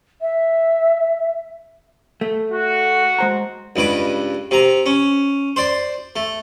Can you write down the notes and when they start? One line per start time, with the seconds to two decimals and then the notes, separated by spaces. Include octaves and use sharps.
0.21 E5
2.21 A3
2.51 F#4
3.19 G#3 C5 A#5
3.76 C#2 G2 B4 D6
4.51 C3 A#5
4.86 C#4
5.56 C5 D5 C6
6.16 A3